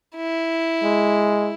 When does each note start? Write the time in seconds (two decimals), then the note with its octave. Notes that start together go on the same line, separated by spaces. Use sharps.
0.16 E4
0.83 G#3